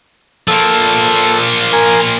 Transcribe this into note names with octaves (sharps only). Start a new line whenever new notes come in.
F3 A#3 A4 E6
A#4 G#5